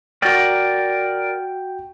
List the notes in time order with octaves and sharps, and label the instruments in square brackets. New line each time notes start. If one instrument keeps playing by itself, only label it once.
[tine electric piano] F#4 G5 [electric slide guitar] A#4 D5